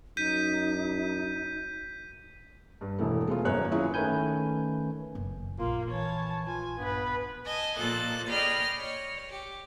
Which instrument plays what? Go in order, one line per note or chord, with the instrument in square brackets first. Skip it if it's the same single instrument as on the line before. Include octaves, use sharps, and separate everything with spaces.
[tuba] F#2 [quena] D#4 [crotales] G6 B6 D#7
[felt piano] G2
E1 E3 A3
G#3 A3 B3 F4
G#1 F#2 A#3 B4 C#5 F#6
F#3 C#4 E4 F4 G#4
[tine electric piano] D#3 A3 C#4 B4 G#5 G6
[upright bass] F#1
[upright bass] A#1 [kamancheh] A#3 [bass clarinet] F4
[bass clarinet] E3 [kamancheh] C#5 A5
[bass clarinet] F4 [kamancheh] G#5
[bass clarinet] G2 [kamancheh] B3 B4
[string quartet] D#5 G#5 A5
A#2 F3 A#3 A4 F#6 A6
G#4 D5 D#5 G5 B5 F6
C#5
G4